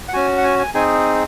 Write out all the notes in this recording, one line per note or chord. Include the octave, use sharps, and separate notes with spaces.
F#5
C#4 F#4 G#5
F#5
G#5
G#5
C4 D#4 G#4 G#5